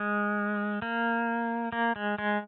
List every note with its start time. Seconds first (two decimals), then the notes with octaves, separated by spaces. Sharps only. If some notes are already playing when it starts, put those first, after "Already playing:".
Already playing: G#3
0.82 A#3
1.73 A#3
1.96 G#3
2.19 G#3